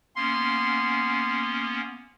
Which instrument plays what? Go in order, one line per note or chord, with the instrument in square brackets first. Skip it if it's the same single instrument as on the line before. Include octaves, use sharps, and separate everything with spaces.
[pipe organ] A#3 B3 C#4 [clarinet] C6